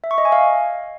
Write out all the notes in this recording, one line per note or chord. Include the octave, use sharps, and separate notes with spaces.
E5
C#6
D#5
G#5
F5